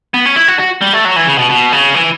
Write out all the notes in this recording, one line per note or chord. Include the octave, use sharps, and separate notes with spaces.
B3
C#4
E4
F#4
F#4
G3
A3
F#3
E3
C#3
B2
B2
C#3
E3